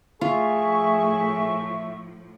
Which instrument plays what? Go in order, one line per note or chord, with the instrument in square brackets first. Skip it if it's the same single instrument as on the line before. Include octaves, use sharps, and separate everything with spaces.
[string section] A2 F3 [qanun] F4 [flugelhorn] G#4 [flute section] E5 C#6